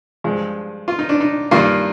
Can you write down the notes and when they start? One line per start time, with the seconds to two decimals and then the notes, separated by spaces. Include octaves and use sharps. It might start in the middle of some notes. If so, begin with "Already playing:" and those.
0.24 G2 F3 G#3
0.88 F4
0.99 D#4
1.09 D4
1.20 D#4
1.51 G2 D#3 G3 A#3 F4